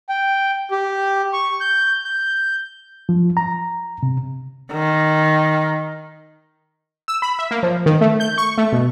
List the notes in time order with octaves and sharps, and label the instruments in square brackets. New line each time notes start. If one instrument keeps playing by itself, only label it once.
[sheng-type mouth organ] G5
G4
C#6
G6
G6
[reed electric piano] F3
A#5
C3
[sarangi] D#3
[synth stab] E6
B5
E5
A#3
F3
D#3
A3
G6
C#6
A3
B2